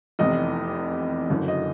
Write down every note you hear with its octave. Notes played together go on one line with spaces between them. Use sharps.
F1 E2 C3 D#5
F#1 F#2 D3
D#5